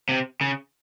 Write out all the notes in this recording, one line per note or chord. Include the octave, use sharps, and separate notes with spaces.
C3
C#3